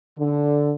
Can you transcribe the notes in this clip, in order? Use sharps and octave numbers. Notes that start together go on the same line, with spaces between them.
D3